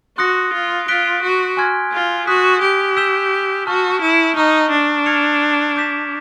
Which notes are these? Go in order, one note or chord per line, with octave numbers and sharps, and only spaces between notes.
F#4 C6 D#6 F#6 A#6 C#7
F4
F4 F#6 B6 D7 G7
F#4
G#5 C6 F6 G#6
F4
F#4 D#6 F#6 B6
G4
E6 G6 B6 E7 G7
F#4 A5 C#6 F6
E4
D#4 A#5 C#6 F6
D4
F6 G#6 C#7 F7
D6 G6 B6 E7